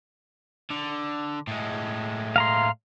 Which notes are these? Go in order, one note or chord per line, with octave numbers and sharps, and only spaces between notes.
D3
A2 G#3
F5 A#5 C6